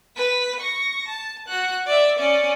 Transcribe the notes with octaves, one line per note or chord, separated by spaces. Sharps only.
B4 B6
C#6 A#6
A5
F#4 F#6
D5 E5
C#4 D5